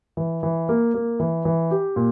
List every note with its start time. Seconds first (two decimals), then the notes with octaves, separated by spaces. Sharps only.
0.17 E3
0.43 E3
0.69 A#3
0.94 A#3
1.20 E3
1.45 E3
1.71 G4
1.96 A#2